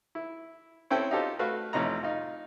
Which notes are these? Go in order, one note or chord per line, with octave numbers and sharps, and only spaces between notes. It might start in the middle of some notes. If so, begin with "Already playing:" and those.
E4
C4 C#4 E4 A4 C5 G5
D#4 F4 G4 A4 C5
A3 F#4 B4 F5
A1 F2 C3 D#4 A#5
D#4 F4